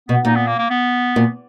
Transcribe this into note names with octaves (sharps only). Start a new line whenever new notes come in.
B2 B3
A#2 D#4
B3
A#3
A#3
B3
A#2